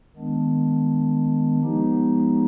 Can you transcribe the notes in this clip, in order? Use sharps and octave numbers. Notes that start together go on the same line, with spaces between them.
D#3 G#3 B3 D4
F3 G#3 B3 D#4 G4